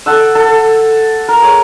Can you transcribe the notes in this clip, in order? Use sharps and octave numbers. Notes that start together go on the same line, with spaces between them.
A4 F#5 E6
A4
A#4
G#4 C#5